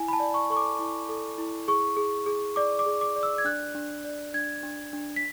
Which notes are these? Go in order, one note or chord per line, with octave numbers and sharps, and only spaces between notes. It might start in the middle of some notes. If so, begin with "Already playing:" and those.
Already playing: E4 G#5
B5
A5
D5
C#6
A4 C#6
D6
E4
A4
E4
G#4 C#6
G#4
G#4
D5 D6
D6
G#4
D6
D5
E6
G#6
D4 F#6
D4
D5
D4 G#6
D4
D4
B6